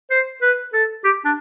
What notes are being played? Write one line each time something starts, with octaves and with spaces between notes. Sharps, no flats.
C5
B4
A4
G4
D4